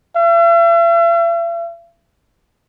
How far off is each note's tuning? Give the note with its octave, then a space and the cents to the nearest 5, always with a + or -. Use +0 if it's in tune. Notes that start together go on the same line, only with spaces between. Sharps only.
E5 +45